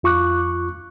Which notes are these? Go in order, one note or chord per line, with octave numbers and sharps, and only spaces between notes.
F2 F4 C#6 D6 F#6